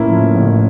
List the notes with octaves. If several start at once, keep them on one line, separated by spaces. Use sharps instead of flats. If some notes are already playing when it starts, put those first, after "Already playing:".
Already playing: A1 A2 A#3 C#4 E4
F3
A1